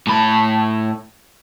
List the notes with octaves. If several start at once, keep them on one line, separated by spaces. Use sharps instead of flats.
A2 B5